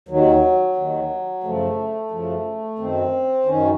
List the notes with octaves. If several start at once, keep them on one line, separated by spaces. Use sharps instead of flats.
D#2 D#3 F#3
D#2 D#3
F#2 C#3 F3 A3
F#2 C#3 F3
F#2 D#3 C4
F#2 D#3 C#4